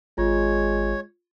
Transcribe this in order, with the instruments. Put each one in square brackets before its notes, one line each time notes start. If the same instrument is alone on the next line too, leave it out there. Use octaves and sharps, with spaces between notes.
[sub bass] G#1 [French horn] G#3 [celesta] F4 [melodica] C#5